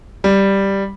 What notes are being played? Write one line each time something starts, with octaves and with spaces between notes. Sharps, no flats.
G3